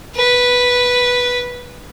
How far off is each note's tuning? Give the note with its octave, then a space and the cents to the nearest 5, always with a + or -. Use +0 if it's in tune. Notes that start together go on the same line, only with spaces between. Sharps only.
B4 -5